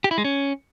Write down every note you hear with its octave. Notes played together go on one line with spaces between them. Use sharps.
G4
E4
G#3
C#4